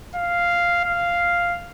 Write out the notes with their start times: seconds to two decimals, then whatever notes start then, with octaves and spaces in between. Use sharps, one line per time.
0.16 F5
0.84 F5